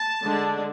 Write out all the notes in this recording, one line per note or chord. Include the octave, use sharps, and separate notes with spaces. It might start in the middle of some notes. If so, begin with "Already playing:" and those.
Already playing: A5
D3 G#3 D4